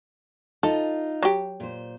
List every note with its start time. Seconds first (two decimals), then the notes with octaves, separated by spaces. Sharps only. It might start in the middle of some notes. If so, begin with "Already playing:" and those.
0.63 D#4 F4 A4
1.22 F#3 G4
1.60 A#2 C5